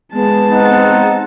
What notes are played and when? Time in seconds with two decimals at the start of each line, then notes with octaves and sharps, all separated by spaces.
0.13 G#3 B3 A5
0.51 C4 D#4 F#5